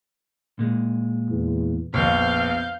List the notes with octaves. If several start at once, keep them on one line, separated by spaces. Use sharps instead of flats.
A#2 G#3
E2
A#1 F2 B3 C5 F5 G6